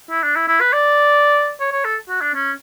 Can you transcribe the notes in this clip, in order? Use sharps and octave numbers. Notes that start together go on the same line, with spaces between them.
E4
D4
E4
E4
B4
D5
C#5
C#5
A4
F#4
D4
C#4